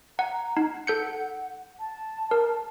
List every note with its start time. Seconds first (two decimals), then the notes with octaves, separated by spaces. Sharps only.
0.19 F#5 A#5
0.57 D#4 F#5
0.87 A4 G6 C#7
1.80 A5
2.31 A#4